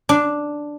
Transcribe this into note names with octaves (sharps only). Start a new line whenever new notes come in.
D4